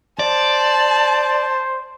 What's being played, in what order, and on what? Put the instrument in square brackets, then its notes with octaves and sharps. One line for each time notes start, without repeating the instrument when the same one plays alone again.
[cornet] C5 [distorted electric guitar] D5 [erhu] A5